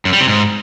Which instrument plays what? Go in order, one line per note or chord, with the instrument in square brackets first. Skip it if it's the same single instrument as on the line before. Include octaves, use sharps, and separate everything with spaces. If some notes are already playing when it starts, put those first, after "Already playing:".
[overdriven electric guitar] F#2
G3
C3
G#2